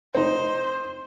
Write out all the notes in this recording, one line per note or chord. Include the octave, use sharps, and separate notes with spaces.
C4 D#4 C5